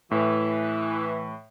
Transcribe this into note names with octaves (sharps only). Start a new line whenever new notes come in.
A2 E3